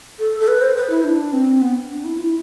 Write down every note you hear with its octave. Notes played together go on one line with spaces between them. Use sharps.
A4
A4
B4
C5
B4
E4
D4
C4
B3
D4
E4
F4
E4